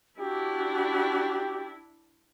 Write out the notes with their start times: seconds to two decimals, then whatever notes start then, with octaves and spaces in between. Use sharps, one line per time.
0.20 D4 E4 F#4 G4